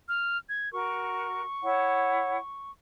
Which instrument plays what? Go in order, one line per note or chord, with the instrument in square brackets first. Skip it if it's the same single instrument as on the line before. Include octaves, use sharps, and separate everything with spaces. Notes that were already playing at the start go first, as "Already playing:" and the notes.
[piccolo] F6
G#6
[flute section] F#4 A#4 [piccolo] C#6
[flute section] E4 C#5 F#5